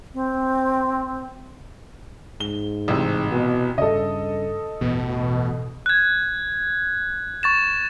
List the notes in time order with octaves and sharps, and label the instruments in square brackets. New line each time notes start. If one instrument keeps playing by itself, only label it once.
[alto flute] C4
[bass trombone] G#2 [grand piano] G7
[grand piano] A1 C3
[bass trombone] B2
[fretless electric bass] G2 C#3 [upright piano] A4 D#5
[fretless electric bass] A1 E2 [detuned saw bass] B2
[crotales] F#6 G#6
C#6 A6 E7